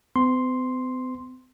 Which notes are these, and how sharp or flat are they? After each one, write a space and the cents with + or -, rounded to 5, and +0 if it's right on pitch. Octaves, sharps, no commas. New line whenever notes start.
C4 -45 C6 +0